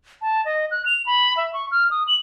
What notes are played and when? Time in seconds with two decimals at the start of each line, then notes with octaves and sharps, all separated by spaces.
0.22 A5
0.45 D#5
0.71 F#6
0.86 F7
1.06 B5
1.37 E5
1.53 C#6
1.71 F6
1.91 D#6
2.08 F#7